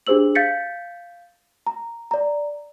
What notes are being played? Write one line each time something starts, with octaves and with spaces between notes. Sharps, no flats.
D4 G4 G#4 C5 E6 F#7
F5 G6 A6 B6 C#7
A#5
D5 A#5